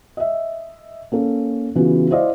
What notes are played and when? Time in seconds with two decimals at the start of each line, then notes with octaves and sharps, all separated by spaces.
0.17 D#5 E5
1.12 A#3 C#4 A4
1.75 C#3 E3 B3 F4 F#4
2.11 E4 C5 D5 D#5 F5